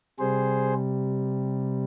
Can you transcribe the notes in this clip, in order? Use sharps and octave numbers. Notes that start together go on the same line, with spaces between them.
C3 G3 G#4 C5